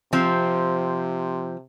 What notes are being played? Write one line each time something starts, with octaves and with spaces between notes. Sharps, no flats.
C3 F3 C4